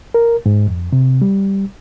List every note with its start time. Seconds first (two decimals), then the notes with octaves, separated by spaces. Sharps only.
0.14 A#4
0.46 G#2
0.68 F2
0.93 C3
1.22 G3